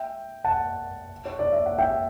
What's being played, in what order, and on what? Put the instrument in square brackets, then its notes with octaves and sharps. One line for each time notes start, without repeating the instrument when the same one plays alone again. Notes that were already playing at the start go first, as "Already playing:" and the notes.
Already playing: [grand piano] E5 G5
F#5 A5
C#5
D5
E5
F#5
E5 G5